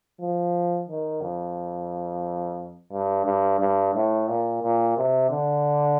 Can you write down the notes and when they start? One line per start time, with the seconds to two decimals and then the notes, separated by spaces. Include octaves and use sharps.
0.21 F3
0.89 D#3
1.22 F2
2.93 G2
3.26 G2
3.60 G2
3.95 A2
4.28 A#2
4.62 A#2
4.97 C3
5.31 D3